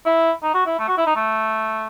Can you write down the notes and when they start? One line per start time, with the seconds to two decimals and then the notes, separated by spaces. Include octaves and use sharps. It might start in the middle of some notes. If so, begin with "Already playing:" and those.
0.06 E4
0.42 D#4
0.54 F#4
0.66 E4
0.79 A3
0.88 F#4
0.98 E4
1.06 D#4
1.16 A3